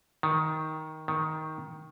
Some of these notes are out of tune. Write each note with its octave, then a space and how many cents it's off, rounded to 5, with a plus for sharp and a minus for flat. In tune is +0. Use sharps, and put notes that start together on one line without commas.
D#3 +10
D#3 +10